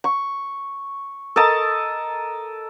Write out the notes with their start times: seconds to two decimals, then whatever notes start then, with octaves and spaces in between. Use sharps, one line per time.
0.04 C#6
1.36 A4 A#4 D#5 A5